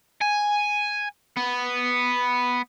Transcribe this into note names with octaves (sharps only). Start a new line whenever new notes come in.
G#5
B3